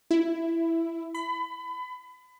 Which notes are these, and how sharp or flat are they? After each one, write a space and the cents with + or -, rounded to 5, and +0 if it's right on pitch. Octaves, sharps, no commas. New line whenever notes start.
E4 +10
B5 +30